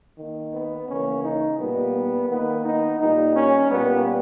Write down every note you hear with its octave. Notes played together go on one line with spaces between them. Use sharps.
D#3 A#3
B3
C#3 E3 A#3 C#4
D#4
A#2 G3 A#3 B3
D#3 A#3 B3
D#4
A#2 G3 A#3 D#4
C#4
A#2 G3 A#3 B3